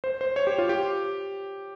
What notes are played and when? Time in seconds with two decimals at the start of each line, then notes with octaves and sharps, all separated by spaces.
0.04 C5
0.21 C5
0.36 C#5
0.47 G4
0.58 F4
0.69 G4